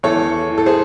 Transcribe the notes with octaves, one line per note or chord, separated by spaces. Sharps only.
E2 A4 C#5
E3
A4
G#4 C5